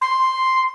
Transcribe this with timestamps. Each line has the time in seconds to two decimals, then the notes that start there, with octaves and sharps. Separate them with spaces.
0.01 C6